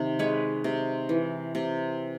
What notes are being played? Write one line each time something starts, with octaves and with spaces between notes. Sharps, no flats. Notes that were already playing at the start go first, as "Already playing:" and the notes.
Already playing: C3 D#3
G#3 B4 C#5
C3
E3
C3